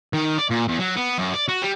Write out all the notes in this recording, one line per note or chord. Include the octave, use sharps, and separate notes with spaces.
D#3
D5
A#2
E2
F#3
B3
F#2
D5
F#4
G3